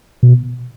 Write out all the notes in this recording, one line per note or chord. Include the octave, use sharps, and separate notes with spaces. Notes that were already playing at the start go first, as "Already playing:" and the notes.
B2